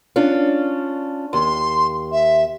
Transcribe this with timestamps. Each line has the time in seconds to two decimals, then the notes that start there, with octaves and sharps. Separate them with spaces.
0.16 C#4 D4 F4
1.33 D#2 C6
2.12 E5